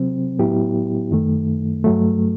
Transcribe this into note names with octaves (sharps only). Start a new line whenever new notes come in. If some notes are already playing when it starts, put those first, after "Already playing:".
Already playing: C3 F#3 C4
A2 F#3 B3 E4 G4
F#2 D#3 A3
G2 F#3 A3